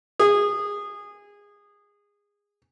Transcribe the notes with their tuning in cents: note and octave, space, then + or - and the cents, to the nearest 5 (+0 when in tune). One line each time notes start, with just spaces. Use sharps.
G#4 -20